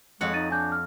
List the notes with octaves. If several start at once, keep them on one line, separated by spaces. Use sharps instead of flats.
F2 G#3 C#5 F#5
D#4 A6 D#7
D4 G#5 G6
F6